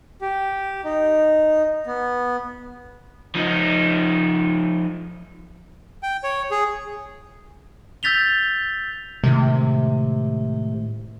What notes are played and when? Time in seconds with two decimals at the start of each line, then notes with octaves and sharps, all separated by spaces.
0.22 G4
0.85 D#4
1.87 B3
3.35 F3 D#4
6.03 G5
6.24 C#5
6.51 G#4
8.03 E6 G6 A6 B6 F7 G7
9.24 A2 C3 D#3 G#3